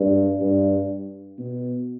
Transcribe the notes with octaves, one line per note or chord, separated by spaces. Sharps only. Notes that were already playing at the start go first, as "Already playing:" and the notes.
Already playing: G2
G2
B2